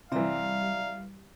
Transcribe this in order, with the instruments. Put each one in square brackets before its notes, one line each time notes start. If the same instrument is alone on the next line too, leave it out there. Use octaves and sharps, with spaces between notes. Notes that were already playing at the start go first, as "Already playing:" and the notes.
[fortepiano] C3 E3 [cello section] G3 [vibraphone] D5 E5 A#5 [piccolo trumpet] F5